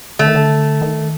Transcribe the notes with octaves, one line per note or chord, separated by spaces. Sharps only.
D3 A3
D#3
D3
D#3